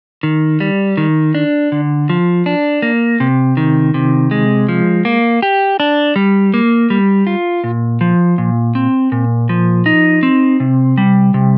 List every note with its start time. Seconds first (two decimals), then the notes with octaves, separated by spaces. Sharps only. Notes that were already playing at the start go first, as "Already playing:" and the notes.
0.23 D#3
0.60 G3
0.97 D#3
1.35 D4
1.72 D3
2.10 F3
2.46 D4
2.82 A#3
3.20 C3
3.57 D#3
3.94 C3
4.31 G#3
4.69 F3
5.05 A#3
5.42 G4
5.80 D4
6.16 G3
6.54 A#3
6.90 G3
7.27 F4
7.64 A#2
8.01 F3
8.38 A#2
8.75 C4
9.12 A#2
9.49 F3
9.86 D#4
10.23 C4
10.60 C3
10.98 G3
11.34 C3